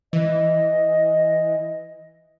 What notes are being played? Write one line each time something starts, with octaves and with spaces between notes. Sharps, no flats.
E3 D#5